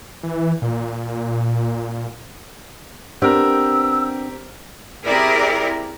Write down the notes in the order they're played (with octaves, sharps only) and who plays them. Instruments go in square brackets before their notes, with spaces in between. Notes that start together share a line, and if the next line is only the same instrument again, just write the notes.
[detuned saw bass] E3
A#2
[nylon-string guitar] B3 C4 D4 [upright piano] G4 A#4 [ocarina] E6
[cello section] C4 E4 G4 G#4 A#4 D5